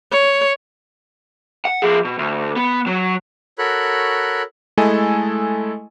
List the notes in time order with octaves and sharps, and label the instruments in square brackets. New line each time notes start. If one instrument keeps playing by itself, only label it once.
[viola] C#5
[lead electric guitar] F#5
F3 G#4
B2
D2
B3
F#3
[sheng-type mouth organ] F#4 A4 A#4 C#5 B5 F#6
[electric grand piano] G#3 A3 E4 A4 D#5 G#5